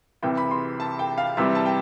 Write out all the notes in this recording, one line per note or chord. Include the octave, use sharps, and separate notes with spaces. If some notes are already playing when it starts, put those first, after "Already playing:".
C2 C3 E3 G5
B5
C6
A5
G5
F5
C2 C3 E3 G3 E5
A5
G5